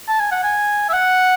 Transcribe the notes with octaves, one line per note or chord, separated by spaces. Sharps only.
A5
G#5
F#5
G#5
E5
F#5